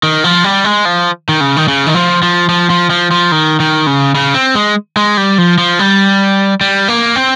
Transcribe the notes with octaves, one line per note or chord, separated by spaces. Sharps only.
D#3
F3
G3
G#3
F3
D#3
C#3
D#3
C#3
D#3
F3
F3
F3
F3
F3
F3
D#3
D#3
C#3
C#3
C4
G#3
G#3
G3
F3
F3
G3
G3
A#3
C4